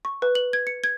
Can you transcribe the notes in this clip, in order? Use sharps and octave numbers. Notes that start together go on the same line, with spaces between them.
C#6
B4
F#7
G#6
C#7
G#6